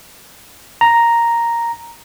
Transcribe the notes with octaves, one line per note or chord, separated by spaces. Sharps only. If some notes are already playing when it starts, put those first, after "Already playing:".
A#5